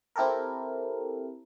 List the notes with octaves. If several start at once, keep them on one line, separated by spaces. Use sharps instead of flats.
C4 E4 G4 A4 A#4